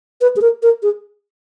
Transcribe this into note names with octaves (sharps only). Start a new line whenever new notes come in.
B4
G#4
A#4
A#4
G#4